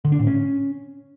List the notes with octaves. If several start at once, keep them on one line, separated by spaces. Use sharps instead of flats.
D3
D4
A2
C#4